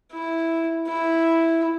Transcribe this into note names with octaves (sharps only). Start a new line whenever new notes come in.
E4
E4